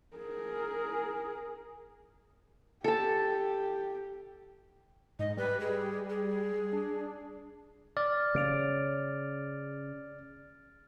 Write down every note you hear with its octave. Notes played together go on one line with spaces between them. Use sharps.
G#4 A#4
G4 A4 A5
G#2 D#5
G3 B4
G#4
G#4
D4
D5 F6
C#3 A6 D7 F7